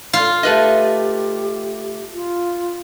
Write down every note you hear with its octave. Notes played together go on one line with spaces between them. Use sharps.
F4
A3 G4 B4 D#5
F4